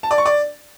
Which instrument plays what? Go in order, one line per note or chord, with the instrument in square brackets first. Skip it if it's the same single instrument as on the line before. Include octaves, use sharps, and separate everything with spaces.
[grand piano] A5
D5
C#6
D5